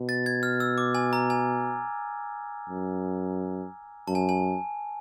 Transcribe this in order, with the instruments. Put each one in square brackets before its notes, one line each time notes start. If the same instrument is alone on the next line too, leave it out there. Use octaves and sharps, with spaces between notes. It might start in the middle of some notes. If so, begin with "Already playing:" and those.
Already playing: [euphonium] B2
[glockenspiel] A6
G#6
F6
E6
D6
G#5
A#5
G#5
[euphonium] F#2
[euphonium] F#2 [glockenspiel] A5
[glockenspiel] G#5
G#5